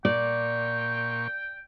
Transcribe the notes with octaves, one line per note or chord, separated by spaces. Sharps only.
A#2 D5 G5 C#6